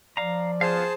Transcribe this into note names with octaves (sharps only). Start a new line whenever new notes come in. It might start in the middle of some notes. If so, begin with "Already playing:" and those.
F3 D5 F5 A#5
B3 F4 G#4 C5 F5 A5